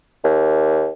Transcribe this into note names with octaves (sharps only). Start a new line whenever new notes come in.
D#2